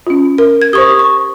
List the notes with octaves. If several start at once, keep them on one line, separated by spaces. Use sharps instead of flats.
C#4 F4
A#4
G#6
G4 C5 C#6 D#6
C#6